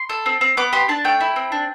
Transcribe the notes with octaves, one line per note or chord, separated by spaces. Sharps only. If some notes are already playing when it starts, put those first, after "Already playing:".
Already playing: C6
A4
C4
C4
B3 D6
G4 C6
D4 A5
A3 G5
E4
C4
D4